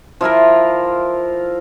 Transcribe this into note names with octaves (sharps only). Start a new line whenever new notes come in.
F3 E4 F4 A#4